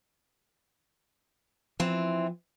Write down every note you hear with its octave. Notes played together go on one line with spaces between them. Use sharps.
E3 F3 C4